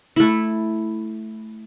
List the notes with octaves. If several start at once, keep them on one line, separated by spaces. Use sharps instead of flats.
A3 E4